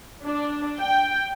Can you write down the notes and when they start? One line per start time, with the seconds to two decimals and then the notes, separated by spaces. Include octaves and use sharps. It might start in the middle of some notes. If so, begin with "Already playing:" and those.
0.24 D4
0.80 G5